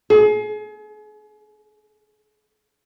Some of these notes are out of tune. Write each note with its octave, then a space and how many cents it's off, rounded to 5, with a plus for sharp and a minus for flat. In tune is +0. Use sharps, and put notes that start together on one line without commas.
G#4 +35